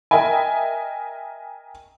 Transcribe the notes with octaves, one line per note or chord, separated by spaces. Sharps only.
A#4 D#5 E5 G5 G#5